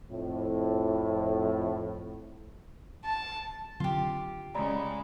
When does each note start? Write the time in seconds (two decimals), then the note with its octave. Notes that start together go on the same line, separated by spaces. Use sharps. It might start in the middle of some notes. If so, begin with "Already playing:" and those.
0.10 F2 A2
3.05 A5
3.80 D3 F#3 C4 F4 G4
4.55 C#3 G#3 D5 A#5 B5